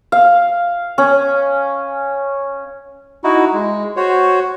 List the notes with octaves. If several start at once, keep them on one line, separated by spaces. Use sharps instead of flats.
F5
C#4
D#4 E4 F#4
G#3
F#4 C5 C#5